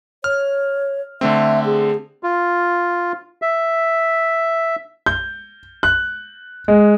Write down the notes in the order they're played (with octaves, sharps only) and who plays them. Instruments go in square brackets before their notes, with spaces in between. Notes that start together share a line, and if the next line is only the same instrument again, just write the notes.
[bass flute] C#5 [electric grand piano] F6
[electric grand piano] D3 A3 C4 [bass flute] E5
[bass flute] G#4
[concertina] F4
E5
[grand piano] G6
F#6
G#3